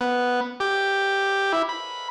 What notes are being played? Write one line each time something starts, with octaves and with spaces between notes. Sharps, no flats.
B3
G4
E4
B5